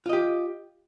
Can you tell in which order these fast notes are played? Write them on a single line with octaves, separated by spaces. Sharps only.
F4 D#5 G4